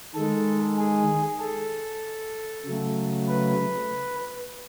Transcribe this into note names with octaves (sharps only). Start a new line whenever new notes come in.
D#3 G#3 A4
G#4
A4
C#3 F#3 A3
B4